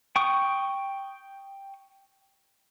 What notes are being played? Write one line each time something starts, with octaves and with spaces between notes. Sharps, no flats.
G5 C#6 D#6